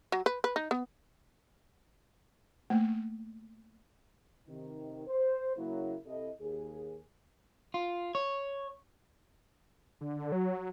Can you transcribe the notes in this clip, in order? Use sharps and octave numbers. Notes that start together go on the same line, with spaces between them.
F#3
B4
B4
D#4
B3
A3 A#3
C3 D#3
C5
C#3 F#3 A#3 E4
C3 E4 A4 D#5
D#2 G#4
F4
C#5
D3
F#3